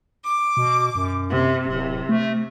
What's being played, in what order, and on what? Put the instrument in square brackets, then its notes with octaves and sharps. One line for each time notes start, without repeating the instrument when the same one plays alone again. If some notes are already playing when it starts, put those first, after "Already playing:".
[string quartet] D6
[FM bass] B2
F#2
[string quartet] C3
[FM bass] D1 [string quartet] C3
[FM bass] A3